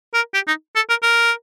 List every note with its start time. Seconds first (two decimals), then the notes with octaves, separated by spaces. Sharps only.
0.14 A#4
0.34 G4
0.48 D#4
0.76 A4
0.89 A#4
1.03 A#4